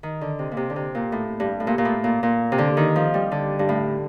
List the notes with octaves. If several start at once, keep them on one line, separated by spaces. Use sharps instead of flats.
D#3
D3
C3
A#2
C3
D3
C3
A#2
A2
G2
A2
A#2
A#2
A2
A#2
A#2
C3
D3
D#3
F3
G3
D3
G2
A2